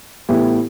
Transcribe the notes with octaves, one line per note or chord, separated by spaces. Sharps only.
A2 E3 B3 E4 G4